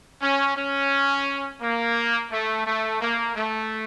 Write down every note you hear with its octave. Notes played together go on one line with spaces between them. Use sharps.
C#4
C#4
A#3
A3
A3
A#3
A3